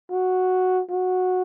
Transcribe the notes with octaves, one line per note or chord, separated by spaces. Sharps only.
F#4
F#4